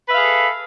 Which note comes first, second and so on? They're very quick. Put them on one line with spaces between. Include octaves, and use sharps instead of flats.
B4 E5 F5 G#4 A4